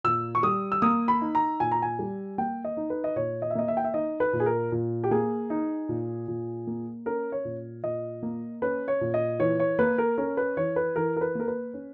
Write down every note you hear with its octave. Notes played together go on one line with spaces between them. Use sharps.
A#2 E6
C#6
G3 D#6
E6
A#3 D#6
B5
D#4
A#5
A#2 G#5
A#5
G#5
G3
A#3 G5
D#5
D#4
B4
D#5
A#2 C#5
D#5
E5
A#3 D#5
E5
G5
E5
D#4 D#5
B4
A#2
G#4
A#4
A#2
G4
A#3 G#4
D#4
A#2
A#2
A#3
C#4 A#4
C#5
A#2
A#2 D#5
A#3
C#4 B4
C#5
A#2
D#5
E3 C#5
C#5
A#3 B4
A#4
C#4 A#4
B4
E3 C#5
B4
E3 A#4
A#4
B4
A#3 A#4
B4
C#4